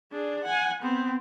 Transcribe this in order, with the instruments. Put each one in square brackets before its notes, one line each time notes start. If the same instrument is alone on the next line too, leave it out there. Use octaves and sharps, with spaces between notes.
[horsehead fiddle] D4 G#4
F#5 G#5
B3 C4